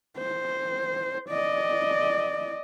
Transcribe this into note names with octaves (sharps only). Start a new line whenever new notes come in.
C5
D5 D#5